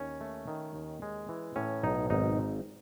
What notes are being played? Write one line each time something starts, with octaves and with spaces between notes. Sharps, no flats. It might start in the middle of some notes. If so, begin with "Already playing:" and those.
Already playing: D#2 C#4
A3
D#3
D#2
G#3
E3
A2 C#4
B1 D#4
G#1 D#4